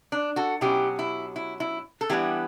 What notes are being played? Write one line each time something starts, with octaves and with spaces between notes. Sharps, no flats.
D4
F#4 A4
B2 F#3 C#4 E4 G4
E4
E4
E4
A4
E3 G3 B3 D4 E4 G4